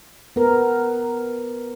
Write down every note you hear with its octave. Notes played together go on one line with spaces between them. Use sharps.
B3 A#4